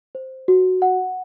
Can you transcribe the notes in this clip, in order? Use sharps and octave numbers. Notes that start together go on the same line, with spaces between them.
C5
F#4
F#5